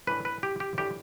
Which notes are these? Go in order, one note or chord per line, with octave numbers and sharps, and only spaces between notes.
A2 E3 A3 D4 B4
B4
G4
G4
A2 E3 A3 D4 G4